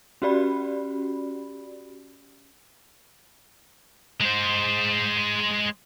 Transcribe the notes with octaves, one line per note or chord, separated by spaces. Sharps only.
C#4 F#4 G4 D5 B5
G#3 C5